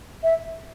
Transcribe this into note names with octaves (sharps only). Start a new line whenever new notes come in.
E5